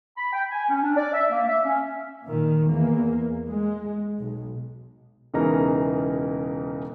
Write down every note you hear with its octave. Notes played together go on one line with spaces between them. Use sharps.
B5
G5
G#5
C#4
D4
D5
E5
A#3
E5
C#4
A#2 D#3
E2 A#3
G#3
B1
E1 C#3 E3 D#4 A#4 A#5